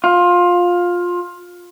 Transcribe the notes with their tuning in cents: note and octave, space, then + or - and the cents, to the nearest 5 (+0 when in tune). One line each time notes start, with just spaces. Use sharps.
F4 +15